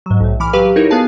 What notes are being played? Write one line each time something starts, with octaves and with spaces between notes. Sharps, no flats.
G#2 F#3
B1 A2
E3 B5 D6 F6
F#3 G4 B4 F5 D6
D#4 E4 F#4 A#4 B4 C#5
B3 G#4 F5 A5